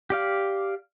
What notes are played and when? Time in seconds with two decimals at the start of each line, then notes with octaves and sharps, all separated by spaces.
0.10 G4 D5 F5